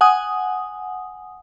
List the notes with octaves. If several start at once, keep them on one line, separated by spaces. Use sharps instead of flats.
F#5 G#5 D#6